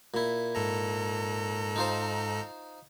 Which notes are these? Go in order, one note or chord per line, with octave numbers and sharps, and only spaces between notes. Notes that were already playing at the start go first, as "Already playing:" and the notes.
A#2 E4
G#2 A4 A#5
D#4 F4 C5